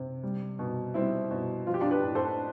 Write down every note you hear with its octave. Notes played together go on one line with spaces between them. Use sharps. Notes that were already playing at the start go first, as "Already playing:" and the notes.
Already playing: C3
G3
B2
G3 C4 E4
B2
F3 F4
G4
D4 F4
G4 B4
A2
A4 C5